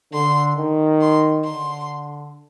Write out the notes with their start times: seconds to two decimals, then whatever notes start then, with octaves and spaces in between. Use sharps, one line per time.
0.12 D3 C6
0.57 D#3
1.01 C6
1.44 D3 C6